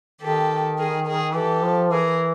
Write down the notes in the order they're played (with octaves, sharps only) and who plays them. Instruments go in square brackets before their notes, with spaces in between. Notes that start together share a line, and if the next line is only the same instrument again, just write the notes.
[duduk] D#3 [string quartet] G4 A4
[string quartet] G#4 A#4
G#4 A#4
[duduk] E3 [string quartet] G4 A4
[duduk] F3
[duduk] E3 [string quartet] G#4 A#4